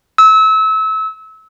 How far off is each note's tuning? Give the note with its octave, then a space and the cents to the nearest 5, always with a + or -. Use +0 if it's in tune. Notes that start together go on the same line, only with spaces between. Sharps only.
E6 -30